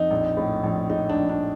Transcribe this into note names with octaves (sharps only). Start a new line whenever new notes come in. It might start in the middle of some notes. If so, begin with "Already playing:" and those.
Already playing: F2 D#4
A#1
A2
A#1
A2 D#4
D4
A#1
D4